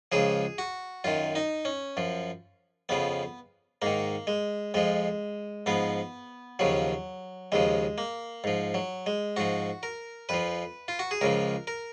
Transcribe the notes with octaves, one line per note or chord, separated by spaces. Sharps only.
C#2 C#3 F3 G#4
F#4
F#2 D#3 F4
D#4
C#4
F#2 F3
F2 C#3 F3 B3
G#2 D#3 A#3
G#3
F2 F3 G#3
G#2 F3 B3
D#2 C#3 F3 F#3
D#2 C#3 F3 G#3
A#3
G#2 F3
F#3
G#3
G#2 F3 F#4
A#4
F2 F3 B4
F4
F#4
G#4
C#2 C#3 F3 A#4
A#4